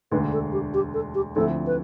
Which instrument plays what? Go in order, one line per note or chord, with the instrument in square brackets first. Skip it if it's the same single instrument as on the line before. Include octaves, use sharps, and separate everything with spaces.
[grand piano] E1 D2 D3 [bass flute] B4
[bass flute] A4
G4
G4
A4
G4
[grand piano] D2 D3 F3 C4 E4 [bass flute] A4
[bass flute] B4